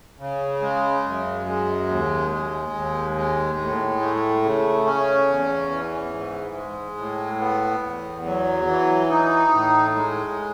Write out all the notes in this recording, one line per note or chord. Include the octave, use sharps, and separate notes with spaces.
C#3
G#3
F#2
G#3
D#2
G#3
D#2
G#3
A2
A3
C#3
C#4
E2
E3
G#2
G#3
A2
B3
E2
F#3
E3
D#4
A2
G#3